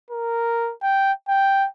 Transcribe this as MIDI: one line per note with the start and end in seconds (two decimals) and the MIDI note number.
0.11 0.72 70
0.82 1.12 79
1.29 1.67 79